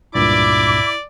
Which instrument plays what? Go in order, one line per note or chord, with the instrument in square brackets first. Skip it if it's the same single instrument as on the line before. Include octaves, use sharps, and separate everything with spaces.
[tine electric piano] C#2 G2 A#2 [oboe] E4 [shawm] D5 [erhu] D6